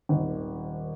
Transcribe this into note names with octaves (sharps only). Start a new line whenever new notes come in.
D#1 G#1